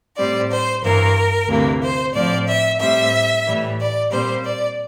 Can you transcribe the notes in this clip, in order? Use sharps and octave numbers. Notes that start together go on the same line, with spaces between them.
A2 G3 C4 D5
C5
G2 E3 A#3 A#4
D2 C3 E3 A#3
C5
A2 F3 C4 D5
E5
A2 G3 C4 E5
A2 E3 G3
D5
A#2 G3 C4 C5
D5